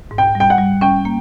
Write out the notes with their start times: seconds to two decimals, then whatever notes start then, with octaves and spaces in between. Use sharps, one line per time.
0.11 G#2
0.18 G5
0.35 G3
0.40 G5
0.50 F#5
0.58 G3
0.81 C#4 G5
1.05 A#3